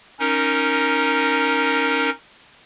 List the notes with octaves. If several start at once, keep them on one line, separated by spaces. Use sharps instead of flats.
C#4 D#4 A#4